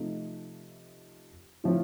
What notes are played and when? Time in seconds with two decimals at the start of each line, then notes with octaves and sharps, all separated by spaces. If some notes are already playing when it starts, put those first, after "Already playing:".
Already playing: C3 F3 A3 D#4
1.64 A2 F3 C4 F4